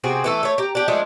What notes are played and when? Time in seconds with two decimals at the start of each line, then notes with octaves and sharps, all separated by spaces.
0.04 C3 C4 F#4 G#4
0.24 E3 A3 A4
0.43 A3 C#5
0.58 G4 A#5
0.75 D4 G4
0.88 F3 G#3 A3 D4